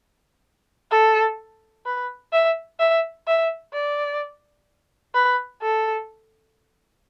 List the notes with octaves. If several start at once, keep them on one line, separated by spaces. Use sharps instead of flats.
A4
B4
E5
E5
E5
D5
B4
A4